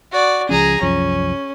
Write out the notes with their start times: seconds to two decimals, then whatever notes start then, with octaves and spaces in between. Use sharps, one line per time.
0.12 F#4 D5
0.49 C#2 F3 C#4 G#4 A#5
0.81 C2 F#2 F3 C#4